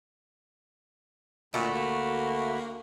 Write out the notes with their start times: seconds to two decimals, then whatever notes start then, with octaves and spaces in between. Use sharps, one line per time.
1.54 D2 A#2 A3 F#4 B5
1.75 A#3